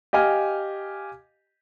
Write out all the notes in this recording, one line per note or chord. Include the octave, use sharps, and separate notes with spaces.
G4 D#5 F5 G#5 F6